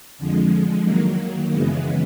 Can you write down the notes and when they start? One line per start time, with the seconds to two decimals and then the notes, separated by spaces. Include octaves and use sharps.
0.18 F2 D3 F3 G#3
0.84 D#3 F#3 A#3
1.51 F#2 C#3 E3 G#3 B3